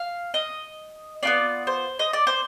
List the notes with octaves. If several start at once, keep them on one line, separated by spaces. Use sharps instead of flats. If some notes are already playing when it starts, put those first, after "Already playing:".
Already playing: F5
D#5
B3 D4 F4 D5
C5
D#5
D5
C5